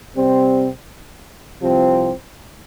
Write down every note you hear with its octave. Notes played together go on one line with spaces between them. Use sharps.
C3 G3 C4
C2 C3 F3 C4